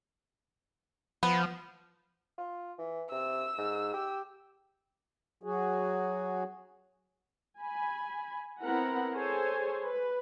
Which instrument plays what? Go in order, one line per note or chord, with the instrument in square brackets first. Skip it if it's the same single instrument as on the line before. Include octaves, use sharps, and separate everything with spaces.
[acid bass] F3 [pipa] B3
[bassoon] F4
E3
[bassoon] C3 [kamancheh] E6
[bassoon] G#2
G4
[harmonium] F#3 F#4 G#4
[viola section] G#5 B5
B3 C4 E4 A#4 F#5 B5
G#4 A4 C5 C#5 G#5
B4